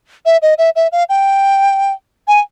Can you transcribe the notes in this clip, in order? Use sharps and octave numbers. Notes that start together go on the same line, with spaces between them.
E5
D#5
E5
E5
F5
G5
G#5